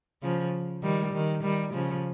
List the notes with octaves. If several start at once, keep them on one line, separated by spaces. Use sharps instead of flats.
C#3 F3
D#3 G3
D#3
D#3 G3
C#3 F3